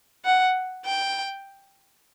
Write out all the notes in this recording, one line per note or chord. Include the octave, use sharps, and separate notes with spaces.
F#5
G5